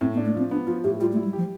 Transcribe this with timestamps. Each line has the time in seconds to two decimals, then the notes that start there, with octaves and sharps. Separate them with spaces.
0.01 A2 C4
0.14 B3
0.17 D4
0.26 A3
0.35 F3 C4
0.51 B3 D4
0.67 F3 F4
0.84 A2 G4
1.00 G3 F4
1.13 A3
1.17 E4
1.24 G3
1.33 F3 G4